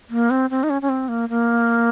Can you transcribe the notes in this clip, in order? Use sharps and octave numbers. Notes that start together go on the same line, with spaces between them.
A#3
C4
C4
D#4
C#4
C#4
C4
A#3
A#3